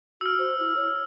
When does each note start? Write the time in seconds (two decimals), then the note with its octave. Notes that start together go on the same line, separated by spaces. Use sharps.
0.21 F#4 E6 F6
0.39 C5
0.59 E4
0.77 C#5